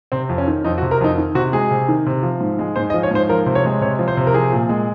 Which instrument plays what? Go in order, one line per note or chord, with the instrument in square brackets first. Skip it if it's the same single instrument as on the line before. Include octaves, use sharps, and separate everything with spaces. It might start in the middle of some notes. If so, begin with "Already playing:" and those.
[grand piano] C3 C4
F2
C#4
D#3
F2 D#4
F#4
C3
A#4
F2 D#4
D#3
C3 F#4
G#3 G#4
C3
D#3
C3
F3
G#2
G#3
G#2 C5
D#5
F3
C#5
G#2 C5
F3 A#4
C3
C#5
G#3
C3 C#5
F3
C5
C3
A#4
F3 G#4
A#2
G#3